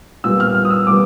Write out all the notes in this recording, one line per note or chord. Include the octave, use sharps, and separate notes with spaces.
A#2 G3 B3 E6
F6
F6
D#6
E6
A#2 G3 B3 D6